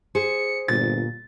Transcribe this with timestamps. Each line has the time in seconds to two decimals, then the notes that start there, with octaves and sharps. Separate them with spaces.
0.15 G#4 C5 C#7
0.68 G1 A#2 A6